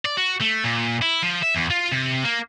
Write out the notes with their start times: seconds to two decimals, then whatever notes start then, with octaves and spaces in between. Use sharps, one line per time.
0.05 D5
0.17 F#4
0.41 A3
0.64 A#2
1.02 E4
1.23 F3
1.43 E5
1.55 E2
1.70 F4
1.91 C3
2.24 A#3